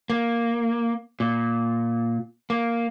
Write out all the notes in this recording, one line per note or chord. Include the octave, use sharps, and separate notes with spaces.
A#3
A#2
A#3